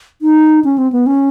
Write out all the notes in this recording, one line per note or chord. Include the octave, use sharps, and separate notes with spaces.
D#4
C#4
C4
B3
C#4